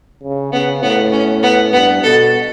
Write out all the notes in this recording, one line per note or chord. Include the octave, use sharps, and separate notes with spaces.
C#3
C#3 B3
A2 B3
C#4
B3
G2 B3
B2 A4